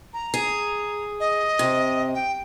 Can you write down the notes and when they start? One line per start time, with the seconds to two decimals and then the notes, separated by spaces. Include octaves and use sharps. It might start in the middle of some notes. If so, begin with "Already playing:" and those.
0.14 A#5
0.34 G#4
1.20 D#5
1.59 C3
2.15 G5